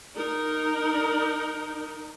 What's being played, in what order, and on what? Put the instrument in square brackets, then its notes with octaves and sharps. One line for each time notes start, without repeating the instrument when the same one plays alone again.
[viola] D#4 A#4